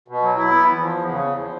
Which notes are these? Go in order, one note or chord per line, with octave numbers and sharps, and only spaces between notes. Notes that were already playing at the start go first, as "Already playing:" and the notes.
B2
F#3
E4
B3
E2
F3
E2
C#3
E2
F3